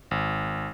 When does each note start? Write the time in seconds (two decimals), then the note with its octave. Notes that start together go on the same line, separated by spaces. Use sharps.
0.11 G#1